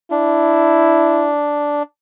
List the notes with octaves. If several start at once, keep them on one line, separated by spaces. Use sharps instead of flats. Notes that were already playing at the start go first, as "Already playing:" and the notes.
D4 E4